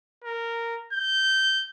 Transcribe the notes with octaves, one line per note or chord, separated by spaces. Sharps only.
A#4
G6